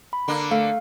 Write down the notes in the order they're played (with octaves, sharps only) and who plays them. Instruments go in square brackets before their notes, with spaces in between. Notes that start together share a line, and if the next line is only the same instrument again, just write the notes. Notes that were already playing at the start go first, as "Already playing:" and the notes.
[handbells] B5
[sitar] D3 A#3
[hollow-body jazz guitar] A3 [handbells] F5